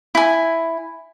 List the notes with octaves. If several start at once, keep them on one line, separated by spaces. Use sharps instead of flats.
E4 G#5